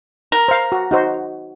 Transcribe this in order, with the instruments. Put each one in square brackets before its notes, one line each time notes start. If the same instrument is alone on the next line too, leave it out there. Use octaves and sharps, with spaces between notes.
[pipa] A#4
[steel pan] C5 F5
F#4
D#4 F#4 C5